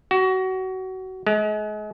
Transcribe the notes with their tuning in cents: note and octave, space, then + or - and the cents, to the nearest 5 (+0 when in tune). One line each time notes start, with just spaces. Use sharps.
F#4 +25
G#3 +35